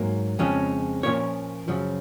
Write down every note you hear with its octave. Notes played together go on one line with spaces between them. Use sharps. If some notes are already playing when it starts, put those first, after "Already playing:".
Already playing: G#2 F#3 A#3
F2 C#3 F3 G#3 C#4
A#2 F3 A#3 C#4 C#5
F#2 C#3 F3